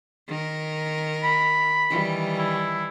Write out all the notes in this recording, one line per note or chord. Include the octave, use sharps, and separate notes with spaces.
D#3 A#4
B5
D#3 E3 G3
E4